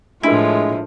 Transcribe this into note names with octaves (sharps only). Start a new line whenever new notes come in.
A2 F3 G#3 D4 E4 A#4